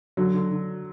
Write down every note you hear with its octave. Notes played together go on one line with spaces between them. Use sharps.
D3 F#3
D3
D3